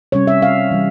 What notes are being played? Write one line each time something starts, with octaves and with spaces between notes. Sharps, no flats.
C3 G3 C#4 C#5
E5
F5
E3 G3